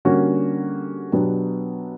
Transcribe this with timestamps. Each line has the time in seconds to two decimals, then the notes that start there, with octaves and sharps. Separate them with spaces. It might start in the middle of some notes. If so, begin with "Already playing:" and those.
0.05 D3 G3 A#3 C#4 F#4
1.12 B2 F#3 B3 D4 G4